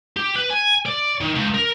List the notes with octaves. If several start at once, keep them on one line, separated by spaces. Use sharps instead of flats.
G4
B4
G#5
D5
D#3
C#2
A#4